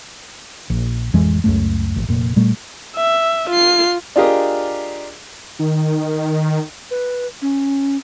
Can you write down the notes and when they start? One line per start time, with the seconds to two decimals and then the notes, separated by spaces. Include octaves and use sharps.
0.70 A#1
1.14 A1 F2 E3 G#3
1.44 C#2 F#2 A3
1.96 A1
2.08 F1 A#2
2.36 A#2 G3 A3
2.97 E5
3.50 F4 C7
4.16 D4 F4 G4 G#4 A#4 D#5
5.59 D#3
6.91 B4
7.42 C#4